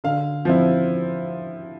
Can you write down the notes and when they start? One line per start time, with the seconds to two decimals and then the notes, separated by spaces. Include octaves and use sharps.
0.04 D3 F5
0.45 F3 C4 E4